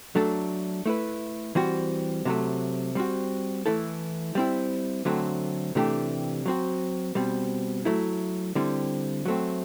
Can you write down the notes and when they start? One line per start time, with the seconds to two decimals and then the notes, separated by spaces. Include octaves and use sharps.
0.15 F#3 A3 D4 A4
0.86 A3 E4 B4
1.55 E3 G3 C4 F#4
2.25 C3 F#3 A3
2.95 G3 C4 F#4
3.66 E3 A3 E4 A4
4.35 G3 C4 E4
5.05 D3 F#3 A3 C4
5.75 C3 E3 A3 D4 G4
6.46 F#3 C4 F#4
7.15 B2 G3 C4
7.85 F#3 A3 E4
8.55 D3 G3 C4 E4
9.26 F#3 A3 C4